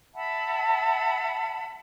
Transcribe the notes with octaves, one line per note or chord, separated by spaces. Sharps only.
E5 F#5 A5 B5